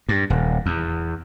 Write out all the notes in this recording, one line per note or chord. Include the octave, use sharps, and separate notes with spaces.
G2
D#1
E2